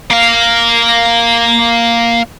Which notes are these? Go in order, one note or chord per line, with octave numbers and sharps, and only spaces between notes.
A#3 F5